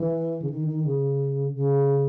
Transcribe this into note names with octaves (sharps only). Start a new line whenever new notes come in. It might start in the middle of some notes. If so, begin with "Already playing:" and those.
Already playing: E3
C#3
D#3
D#3
C#3
C#3